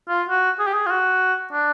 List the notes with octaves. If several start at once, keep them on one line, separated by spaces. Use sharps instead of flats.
F4
F#4
G#4
G4
G#4
F4
F#4
D4